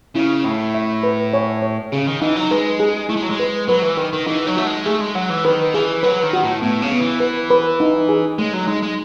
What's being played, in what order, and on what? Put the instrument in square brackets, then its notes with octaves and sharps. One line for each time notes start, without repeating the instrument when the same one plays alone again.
[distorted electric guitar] C#3 [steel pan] E4
[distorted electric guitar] A2 [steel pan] E4
[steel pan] E5
B4
C#5
C#5
[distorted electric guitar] C#3 [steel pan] G#4
[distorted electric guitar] D#3
[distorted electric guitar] E3 [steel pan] D#4
[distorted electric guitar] F#3
[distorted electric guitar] G#3 [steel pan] B4
[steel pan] G#4
[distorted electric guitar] A3 [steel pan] E4
[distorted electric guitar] G#3
F#3
G#3
[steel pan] B4
[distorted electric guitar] F#3 [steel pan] B4
[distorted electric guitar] E3
[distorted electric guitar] D#3 [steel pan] B4
[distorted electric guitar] D#3
[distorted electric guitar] E3 [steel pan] D#4
[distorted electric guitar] F#3
[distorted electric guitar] A3 [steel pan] F#4
[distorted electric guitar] G#3
[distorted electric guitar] A3 [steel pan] G#4
[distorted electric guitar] G#3
[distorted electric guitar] F#3 [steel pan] F#5
[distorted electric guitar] E3
[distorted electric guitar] D#3 [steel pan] B4
[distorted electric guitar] E3 [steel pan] G#4
[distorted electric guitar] F#3 [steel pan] B4
[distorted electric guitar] D#3
[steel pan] F#4
[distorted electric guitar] A2
[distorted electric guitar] A2 [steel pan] B3
[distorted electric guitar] C#3
[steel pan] B3
[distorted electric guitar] E3
[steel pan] B4
B4
D#4
G#4
[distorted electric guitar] G#3 [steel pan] A3
[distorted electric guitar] F#3
[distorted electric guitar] G#3 [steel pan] D#4
[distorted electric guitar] G#3